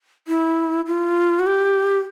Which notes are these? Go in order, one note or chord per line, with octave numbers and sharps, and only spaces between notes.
E4
F4
F#4
G4